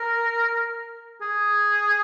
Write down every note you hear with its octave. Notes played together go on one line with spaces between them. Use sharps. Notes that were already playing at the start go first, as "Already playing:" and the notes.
Already playing: A#4
G#4